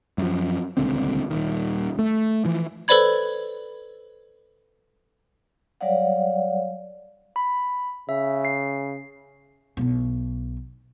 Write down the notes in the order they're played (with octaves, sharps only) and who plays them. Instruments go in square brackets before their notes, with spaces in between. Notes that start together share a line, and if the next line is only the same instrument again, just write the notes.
[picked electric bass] F#2 F3
D#1 C#2 D3 C4
D#1 A#1 D#3
A3
E3 F3
[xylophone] A4 B4 C5 D5 B5 G#6
[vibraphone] F#3 G3 C#5 D5 F5 F#5
[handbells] B5
[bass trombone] C#3 [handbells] E5
[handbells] C7
[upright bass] B1 E4